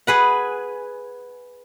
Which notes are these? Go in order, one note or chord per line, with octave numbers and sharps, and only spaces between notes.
G#4 B4 F#5